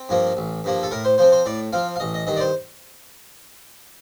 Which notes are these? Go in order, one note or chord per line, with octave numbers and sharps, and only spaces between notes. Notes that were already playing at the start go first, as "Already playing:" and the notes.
Already playing: C4
G2 F3 A#3
A1
G2 F3 A#3
A4
A2 A#4
C5
F3 C4 C5
C5
A2 D5
F3 C4 F5
F5
A1 D#5
D#5
G2 D#3 D#5
D5
C5